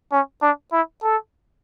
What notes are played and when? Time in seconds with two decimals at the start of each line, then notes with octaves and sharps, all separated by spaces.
0.12 C#4
0.42 D4
0.72 E4
1.03 A4